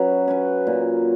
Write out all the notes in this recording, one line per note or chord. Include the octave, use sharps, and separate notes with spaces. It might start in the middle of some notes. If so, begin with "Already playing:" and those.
Already playing: F#3 C#4 F#4 B4
C#4 F#4 B4
A#2